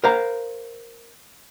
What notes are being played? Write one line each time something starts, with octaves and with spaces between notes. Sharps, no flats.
A#4 C5 F5 A#5